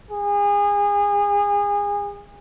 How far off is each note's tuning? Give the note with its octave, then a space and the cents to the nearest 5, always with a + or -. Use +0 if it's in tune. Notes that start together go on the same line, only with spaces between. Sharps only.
G#4 -30